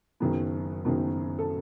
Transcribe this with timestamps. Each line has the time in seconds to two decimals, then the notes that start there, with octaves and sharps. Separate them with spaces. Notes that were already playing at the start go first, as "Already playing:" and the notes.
0.20 F#1 F#2 D#3 F#3 B3
0.85 F#1 F#2 D#3 F#3 B3
1.39 A4